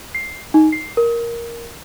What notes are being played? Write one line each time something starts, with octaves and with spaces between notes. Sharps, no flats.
C7
D#4
C7
A#4